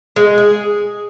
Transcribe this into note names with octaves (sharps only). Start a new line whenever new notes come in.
G#3
G#4